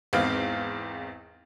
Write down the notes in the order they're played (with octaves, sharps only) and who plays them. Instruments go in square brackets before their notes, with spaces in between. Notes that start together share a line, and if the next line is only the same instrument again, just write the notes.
[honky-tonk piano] G#1 E2 C4 F5